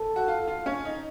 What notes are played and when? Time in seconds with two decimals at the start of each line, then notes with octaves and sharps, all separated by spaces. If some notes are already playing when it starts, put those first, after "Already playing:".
Already playing: A4
0.16 F#4
0.28 F4
0.48 F4
0.66 C#4
0.85 D#4